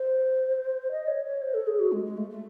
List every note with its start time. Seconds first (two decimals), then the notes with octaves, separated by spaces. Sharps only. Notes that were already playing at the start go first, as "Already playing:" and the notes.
Already playing: C5
0.91 D#5
1.07 C#5
1.25 C#5
1.42 C5
1.54 A4
1.67 G#4
1.79 F#4
1.92 G#3
2.05 G#3
2.17 A3
2.30 A3